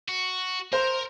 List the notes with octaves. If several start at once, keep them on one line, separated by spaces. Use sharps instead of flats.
F#4
A#4 C5 A#5